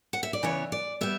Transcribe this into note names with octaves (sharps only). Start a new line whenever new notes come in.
F#5
E5
D5
C#3 E3 B3 C#5
D5
G3 B3 E5